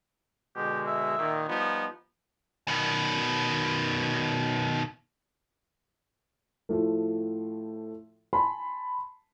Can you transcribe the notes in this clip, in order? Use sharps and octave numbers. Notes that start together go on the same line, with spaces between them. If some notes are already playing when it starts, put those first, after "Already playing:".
B2 D3 G#3 G4
E5
A#2 D#3
F3 G3 B3 D#4
B2 D#3
A2 F3 A3
G#5 A5 B5 C6